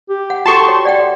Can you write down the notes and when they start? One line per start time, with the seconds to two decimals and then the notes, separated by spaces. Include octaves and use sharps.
0.10 G4
0.30 F#5
0.46 F#4 A4 A5 C6 C#6
0.68 C#5
0.85 D5 F#5 G5